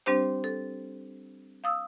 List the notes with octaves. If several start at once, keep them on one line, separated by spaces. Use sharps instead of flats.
G3 C4 D4 G4 C5
A4
F5 D#6 E6